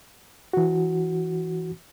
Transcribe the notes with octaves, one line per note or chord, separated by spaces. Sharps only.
E3 F#4